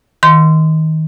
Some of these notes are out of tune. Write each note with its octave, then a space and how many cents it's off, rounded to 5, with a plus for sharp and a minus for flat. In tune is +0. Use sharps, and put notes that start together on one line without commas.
D#3 +25 C6 -20